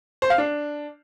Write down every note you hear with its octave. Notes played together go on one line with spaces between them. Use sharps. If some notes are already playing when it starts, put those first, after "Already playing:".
C5
F5
D4